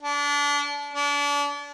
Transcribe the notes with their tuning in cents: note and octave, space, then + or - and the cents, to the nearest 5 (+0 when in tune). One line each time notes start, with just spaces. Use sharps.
D4 -30
D4 -35